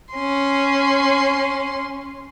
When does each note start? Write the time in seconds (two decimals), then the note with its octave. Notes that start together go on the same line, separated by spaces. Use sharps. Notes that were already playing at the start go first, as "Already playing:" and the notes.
0.14 C#4 C6